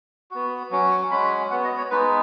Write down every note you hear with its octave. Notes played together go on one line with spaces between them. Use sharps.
B3 F#4
F#3 C#4 F#4
C#6
G#3 C#4 F#4 B5
B3 F#4 F#5
D#5
C#5
G#3 B3 D#4 B4